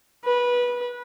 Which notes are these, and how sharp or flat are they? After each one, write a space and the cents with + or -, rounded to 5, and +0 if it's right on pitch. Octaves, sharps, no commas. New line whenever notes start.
B4 -20